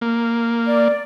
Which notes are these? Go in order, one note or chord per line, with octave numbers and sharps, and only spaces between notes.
A#3
D5